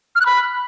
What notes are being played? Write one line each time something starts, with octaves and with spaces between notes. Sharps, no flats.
F6
F#6
B5